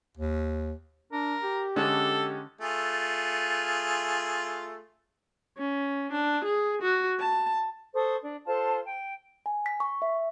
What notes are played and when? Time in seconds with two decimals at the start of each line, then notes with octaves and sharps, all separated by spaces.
0.17 D#2
1.12 D4 A#4
1.43 G4
1.76 D3 G#3 C#4 A4
2.61 A3 F4 G#4
5.58 C#4
6.12 D4
6.44 G#4
6.82 F#4
7.20 A5
7.95 A4 C5 C#6 D#6
8.22 D4
8.47 F4 A4 C5 A5
8.86 G5
9.46 G#5
9.66 B6
9.80 C#6
10.02 E5